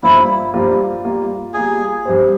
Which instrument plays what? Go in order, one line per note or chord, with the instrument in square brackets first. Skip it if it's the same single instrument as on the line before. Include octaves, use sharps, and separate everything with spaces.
[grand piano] G2 G3 A#3 F4 C5 [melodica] E4
[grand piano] G2 G3 A#3 F4 C5
G3 A#3 F4
[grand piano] G3 A#3 F4 [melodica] G#4
[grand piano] G2 G3 C4 G4 C5